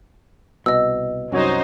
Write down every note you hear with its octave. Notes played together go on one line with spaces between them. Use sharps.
C2 B2 D#5 E6
C2 F#2 F#3 C#4 D#4 F#4 C5 C#5